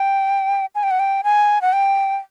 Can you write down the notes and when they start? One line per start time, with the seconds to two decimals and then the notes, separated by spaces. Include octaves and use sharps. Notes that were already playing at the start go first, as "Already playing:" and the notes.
Already playing: G5
0.75 G#5
0.83 G5
0.91 F#5
0.99 G5
1.24 G#5
1.62 F#5
1.73 G5